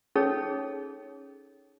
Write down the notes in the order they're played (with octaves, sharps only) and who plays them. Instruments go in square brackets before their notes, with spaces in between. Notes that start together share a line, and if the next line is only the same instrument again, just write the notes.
[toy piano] C#4 D#4 G#4 A4 C#5